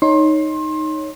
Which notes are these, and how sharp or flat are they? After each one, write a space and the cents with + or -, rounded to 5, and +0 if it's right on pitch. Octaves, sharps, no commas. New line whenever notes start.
D#4 +0 C#5 +0 C6 +25